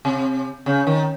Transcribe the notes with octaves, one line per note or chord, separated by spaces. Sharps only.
C3
C#3
D#3